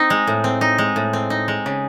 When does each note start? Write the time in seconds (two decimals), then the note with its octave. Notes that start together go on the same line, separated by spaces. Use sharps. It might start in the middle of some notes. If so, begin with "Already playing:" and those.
Already playing: C4 D#4
0.10 G#3
0.27 A2
0.44 C4
0.61 D#4
0.78 G#3
0.96 A2
1.13 C4
1.30 D#4
1.48 G#3
1.66 C#3